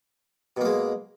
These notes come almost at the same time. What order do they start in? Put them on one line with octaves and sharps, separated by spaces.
B2 A#3 G#3